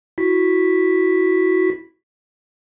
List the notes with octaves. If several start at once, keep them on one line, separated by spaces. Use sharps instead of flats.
E4 F#4 B6